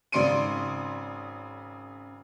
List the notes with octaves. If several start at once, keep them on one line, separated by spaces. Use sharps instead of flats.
G#1 C#3 D5 C6 D7 D#7